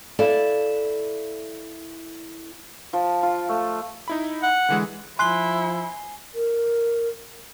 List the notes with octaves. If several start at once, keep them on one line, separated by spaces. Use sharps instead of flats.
E4 A4 D5 F5
F3
F4
A3
D#4 E4 B5
F#5
D3 E3 G#3
F3 E4 G#5 C6 F#6 C7 G7
A#4